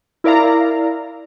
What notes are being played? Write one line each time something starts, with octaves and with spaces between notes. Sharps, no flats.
E4 A#4 D5 F5 A#5